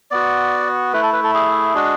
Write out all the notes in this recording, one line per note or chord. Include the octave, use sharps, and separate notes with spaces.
B3 F#4 D5
A3 E4 B4
A4
B4
A4
G#4
G#3 D4 F#4